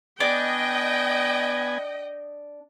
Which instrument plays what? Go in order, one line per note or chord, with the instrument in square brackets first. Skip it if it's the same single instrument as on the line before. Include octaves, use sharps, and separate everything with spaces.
[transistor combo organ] B3 G#5 [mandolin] D4 [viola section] D#5 G5